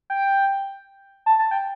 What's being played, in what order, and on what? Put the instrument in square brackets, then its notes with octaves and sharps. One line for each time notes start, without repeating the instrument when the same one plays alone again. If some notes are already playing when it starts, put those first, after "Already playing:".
[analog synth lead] G5
A5
A5
G5